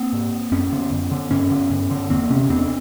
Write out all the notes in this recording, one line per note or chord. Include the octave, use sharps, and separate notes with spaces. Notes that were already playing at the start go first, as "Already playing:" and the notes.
Already playing: A#3 C4
G#2
F#2 B3 C#4
D3
F#2
D3
G2 B3 C#4
D3
G2
D3
E2 A#3 C4
C3 B3 C#4
E2 C4 D4